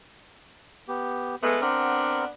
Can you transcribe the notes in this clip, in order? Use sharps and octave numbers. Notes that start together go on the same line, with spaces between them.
B3 G4
G#3 A3 B3
B3 C4 D4 A#4